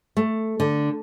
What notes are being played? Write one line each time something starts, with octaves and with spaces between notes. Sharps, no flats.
A3
D3